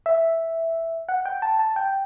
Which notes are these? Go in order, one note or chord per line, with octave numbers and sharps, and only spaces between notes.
E5
F#5
G5
A5
A5
G5